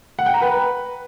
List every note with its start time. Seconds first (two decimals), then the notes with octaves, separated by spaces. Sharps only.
0.19 F#5
0.26 G5
0.34 A#5
0.42 B4